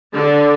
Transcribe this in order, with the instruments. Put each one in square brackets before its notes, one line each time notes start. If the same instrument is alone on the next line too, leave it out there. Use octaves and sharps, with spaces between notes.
[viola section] D3